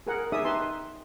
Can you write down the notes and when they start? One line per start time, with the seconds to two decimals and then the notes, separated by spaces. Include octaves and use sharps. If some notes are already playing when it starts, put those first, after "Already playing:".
0.07 G#4 A#4 F#5
0.32 D#4 G#4 D5 E5 D#6
0.45 D#4 G4 B4 E5 A5 C6